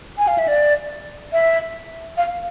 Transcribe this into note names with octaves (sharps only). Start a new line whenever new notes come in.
G#5
F5
E5
D5
E5
F5